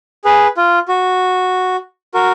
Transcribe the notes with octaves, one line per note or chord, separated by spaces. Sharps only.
G#4 B4
F4
F#4
F#4 A#4